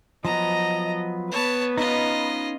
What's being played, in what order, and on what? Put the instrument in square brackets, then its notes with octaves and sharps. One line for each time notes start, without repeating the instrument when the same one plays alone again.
[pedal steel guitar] F3 F#3 B3 [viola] D#5 [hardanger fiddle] A#5
[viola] B3 B4 [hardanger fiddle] C#5 A5
[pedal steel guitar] C#4 D#4 [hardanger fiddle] F4 D#5